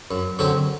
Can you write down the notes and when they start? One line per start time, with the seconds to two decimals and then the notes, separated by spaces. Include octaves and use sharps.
0.11 F#2
0.39 D3 F#3 C4 G4